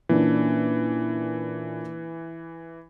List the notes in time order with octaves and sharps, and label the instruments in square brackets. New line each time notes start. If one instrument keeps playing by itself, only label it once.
[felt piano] A#2 C#4 D4 [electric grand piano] E3